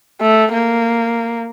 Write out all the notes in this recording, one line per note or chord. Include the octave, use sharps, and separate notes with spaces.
A3
A#3